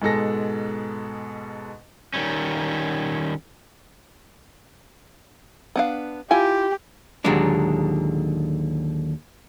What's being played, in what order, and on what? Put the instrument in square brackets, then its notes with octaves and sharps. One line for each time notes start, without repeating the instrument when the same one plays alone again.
[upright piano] G#2 B2 G#3 A4 A5 A#6
[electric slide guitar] D#3 G3 C#4
[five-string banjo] B3 D4 F5
[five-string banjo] E4 F4 G#5 [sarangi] G4
[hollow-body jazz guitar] D#2 A#2 D3 F#3 G#3 D4